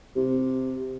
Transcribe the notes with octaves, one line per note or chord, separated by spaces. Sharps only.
C3